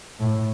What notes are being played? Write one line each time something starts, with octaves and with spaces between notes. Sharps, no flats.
A2